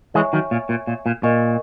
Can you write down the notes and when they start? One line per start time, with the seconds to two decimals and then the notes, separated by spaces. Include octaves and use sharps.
0.14 E3 G#3 C#5 E5 G#5 C#6
0.33 D#3 F#3
0.51 A#2
0.69 A#2
0.87 A#2
1.06 A#2
1.23 A#2 A#4 D#5 G#5 C#6